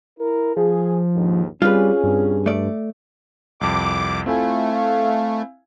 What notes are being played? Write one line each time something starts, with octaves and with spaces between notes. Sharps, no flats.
E4 A#4
F3 G#4
A#1 D#2 G#2
G3 C4 C#4 F4 G#4 B4
G2
A3 D5
C2 F2 D6
A3 C4 E4 F4 G#5
F5